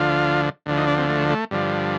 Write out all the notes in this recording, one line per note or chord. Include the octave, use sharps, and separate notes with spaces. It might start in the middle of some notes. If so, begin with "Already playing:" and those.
Already playing: D2 D3 F3 F4
D2 D3 F3
D#4
D4
C4
A3
A3
G2 D3 F3